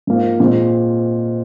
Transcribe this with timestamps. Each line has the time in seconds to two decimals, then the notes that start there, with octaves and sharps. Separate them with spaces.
0.07 G#2 F3 A#3
0.40 A#2 G#3 C4